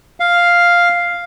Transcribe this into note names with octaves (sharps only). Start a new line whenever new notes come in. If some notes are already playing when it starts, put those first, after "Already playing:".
F5